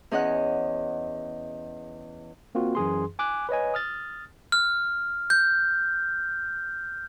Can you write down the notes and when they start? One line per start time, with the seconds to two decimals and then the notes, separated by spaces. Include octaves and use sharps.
0.11 E2 C#4 G#4 D#5 F#5 F#6
2.55 A#3 C4 F4 F#4
2.75 F#2 E3 G#4 C6
3.19 G#5 D6 F#6
3.49 B4 C#5 D#5 G#5
3.74 D#6 F6 A6
4.52 F6
5.30 G6